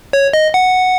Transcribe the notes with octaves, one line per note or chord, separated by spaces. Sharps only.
C#5
D#5
F#5